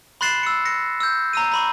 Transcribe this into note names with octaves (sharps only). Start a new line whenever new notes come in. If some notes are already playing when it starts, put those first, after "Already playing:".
B5 C6 F#6 A6 C7 E7
E6 C#7
A#6 C#7
E6 G6
A#5 E6 D#7
A#5 B5 C#6